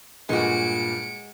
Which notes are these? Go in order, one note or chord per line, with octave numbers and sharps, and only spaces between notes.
G2 A#2 G#3 F#4 C#7 D7